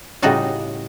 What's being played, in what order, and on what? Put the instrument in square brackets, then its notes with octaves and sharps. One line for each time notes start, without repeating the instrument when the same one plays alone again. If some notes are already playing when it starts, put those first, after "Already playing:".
[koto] A2 C#3 G3 D#4 F#4 A5